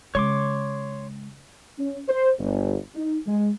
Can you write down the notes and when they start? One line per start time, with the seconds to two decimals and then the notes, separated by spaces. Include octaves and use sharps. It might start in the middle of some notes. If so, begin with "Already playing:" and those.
0.15 C#3 G#3 C#5 C6 D6
1.79 C#4
2.08 C5
2.39 G1
2.95 D#4
3.26 G#3